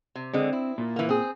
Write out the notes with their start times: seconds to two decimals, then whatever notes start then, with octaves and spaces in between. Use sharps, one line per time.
0.15 C3
0.33 D3 G#3 C4
0.53 E4
0.78 A#2
0.96 E3 A#3
1.09 C4 G#4